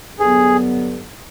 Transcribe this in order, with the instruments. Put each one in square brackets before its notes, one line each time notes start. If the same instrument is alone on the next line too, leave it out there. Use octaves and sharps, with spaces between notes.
[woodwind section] G2 D3 F#3 B3 [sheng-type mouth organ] G#4